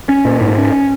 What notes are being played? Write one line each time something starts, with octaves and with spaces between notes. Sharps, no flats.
C#4
A#2
G#2
C#4